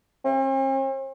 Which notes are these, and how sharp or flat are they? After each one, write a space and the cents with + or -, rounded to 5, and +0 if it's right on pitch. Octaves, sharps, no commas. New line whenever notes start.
C4 +45